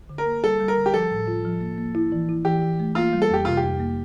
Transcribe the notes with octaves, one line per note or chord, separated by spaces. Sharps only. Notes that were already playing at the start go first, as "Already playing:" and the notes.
D3
A#4
A#3
G3 A4
G3
A#4
D3
G4
F3 A4
A2
F4
F3
A#3
A#3
E4
E3
E4
E3 G4
E3
A3
A#3 F4
G3
A4
F2 G4
C3 F4
G4
F2
A#3